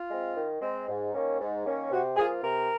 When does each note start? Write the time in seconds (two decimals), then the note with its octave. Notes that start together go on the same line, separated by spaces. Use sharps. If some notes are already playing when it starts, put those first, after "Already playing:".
Already playing: F4
0.10 G#3 C4
0.35 D#3
0.62 G#3 C4
0.88 G#2
1.14 D#3 A#3 C#4
1.40 G#2
1.65 D#3 A#3 C#4
1.91 C3 F#4
2.17 F3 A#3 F4 G#4
2.43 C3 A#4